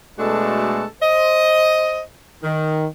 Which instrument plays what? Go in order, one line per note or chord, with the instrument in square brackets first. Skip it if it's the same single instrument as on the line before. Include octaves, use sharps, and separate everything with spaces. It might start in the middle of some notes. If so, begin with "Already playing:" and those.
[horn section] B2 G#3 A3 D4 F#4 A4
C5 D#5
D#3